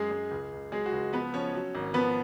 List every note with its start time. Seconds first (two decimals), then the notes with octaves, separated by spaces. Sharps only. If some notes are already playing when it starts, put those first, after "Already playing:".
Already playing: F#2 G#3 G#4
0.11 G#3
0.31 C#2
0.52 C#2
0.72 F#3 G#3 G#4
0.86 F#4
0.92 C#2
1.13 F3 B3 B4
1.33 F3 C#4 C#5
1.54 F#3
1.75 G#1
1.94 F3 B3 B4